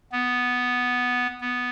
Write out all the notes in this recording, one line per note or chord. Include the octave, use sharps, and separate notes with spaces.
B3
B3